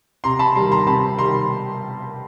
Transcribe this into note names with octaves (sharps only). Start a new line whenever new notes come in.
C3 A#5 C6
A5 B5
D#3 G3 A#5 C6
A#5 C6
C3 A5 B5
D#3 G3 A#5 C6